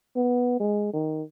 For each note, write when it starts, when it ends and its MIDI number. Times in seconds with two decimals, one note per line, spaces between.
0.16 0.58 59
0.60 0.92 56
0.93 1.23 51